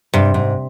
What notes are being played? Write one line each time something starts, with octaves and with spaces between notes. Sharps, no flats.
G2 C3
G#2